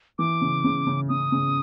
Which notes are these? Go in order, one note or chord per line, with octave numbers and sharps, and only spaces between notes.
E3 D6
C#3
C#3
C#3
C#3 D#6
C#3